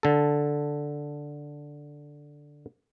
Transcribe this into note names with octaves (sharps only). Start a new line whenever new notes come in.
D3 A4